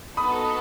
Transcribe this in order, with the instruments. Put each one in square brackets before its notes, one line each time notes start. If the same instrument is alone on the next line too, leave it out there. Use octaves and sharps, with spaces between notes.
[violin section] B3 D#4 F#4 A4 [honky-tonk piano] B5 D#6